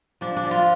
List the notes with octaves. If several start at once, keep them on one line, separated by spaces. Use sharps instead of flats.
F3 D4
D4
F3
F4